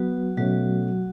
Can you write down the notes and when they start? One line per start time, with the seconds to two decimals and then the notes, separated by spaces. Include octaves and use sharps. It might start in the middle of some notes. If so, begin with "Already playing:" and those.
Already playing: F#3 B3 F#4
0.37 B2 F#3 A3 C#4 F#4